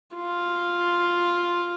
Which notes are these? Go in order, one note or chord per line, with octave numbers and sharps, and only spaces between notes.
F4